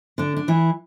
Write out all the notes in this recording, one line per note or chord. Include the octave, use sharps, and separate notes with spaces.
D3 D4
D4
E3 E4